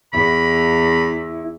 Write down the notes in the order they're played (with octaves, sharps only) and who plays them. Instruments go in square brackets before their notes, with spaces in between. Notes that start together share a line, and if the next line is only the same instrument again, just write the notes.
[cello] E2 [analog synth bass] E4 [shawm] B5